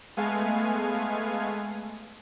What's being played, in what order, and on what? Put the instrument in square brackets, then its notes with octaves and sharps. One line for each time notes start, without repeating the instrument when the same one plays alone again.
[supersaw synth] G#3 A3 B3 F5 G#5